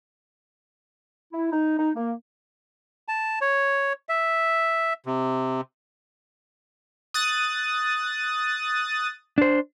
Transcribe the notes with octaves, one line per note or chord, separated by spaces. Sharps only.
E4
D#4
D#4
A#3
A5
C#5
E5
C3
D#6 F#6 A6
D4 C5